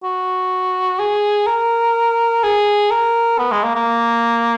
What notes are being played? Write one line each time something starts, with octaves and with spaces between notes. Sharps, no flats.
F#4
G#4
A#4
G#4
A#4
B3
G#3
A#3
A#3